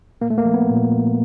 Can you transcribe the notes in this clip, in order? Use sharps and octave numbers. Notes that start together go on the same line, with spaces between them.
A#2 A#3
A3
A#3
F3
B3
A#2
F3